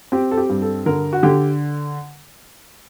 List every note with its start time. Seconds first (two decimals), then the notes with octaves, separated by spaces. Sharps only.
0.12 C4 G4
0.31 A4
0.37 G4
0.49 G2
0.62 A4
0.86 D3 A#4
1.13 F#4
1.23 D3 G4